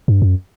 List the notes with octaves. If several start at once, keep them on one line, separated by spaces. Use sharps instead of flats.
G2
F#2